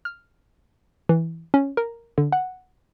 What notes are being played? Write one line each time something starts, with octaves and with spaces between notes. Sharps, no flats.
F6
E3
C#4
A#4
D3
F#5